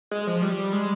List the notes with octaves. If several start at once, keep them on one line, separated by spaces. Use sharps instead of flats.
G#3
F3
G3
G#3